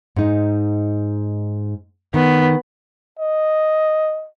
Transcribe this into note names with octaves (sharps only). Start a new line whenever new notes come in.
G#2 D#4
D#3 B3
D#5